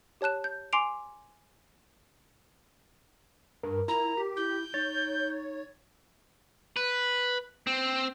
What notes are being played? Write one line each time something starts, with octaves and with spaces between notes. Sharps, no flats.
G4 C#5 A5 F#6 E7
G6
G#5 C6 D6 C7 D7 F7
G2 A#4
E4 F4 A#5
G4
E4 G6
D#4 C#5 A6
B4
C4